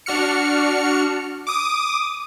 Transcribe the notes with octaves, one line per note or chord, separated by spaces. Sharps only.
D4 F#4 F6 C#7
D6 D#6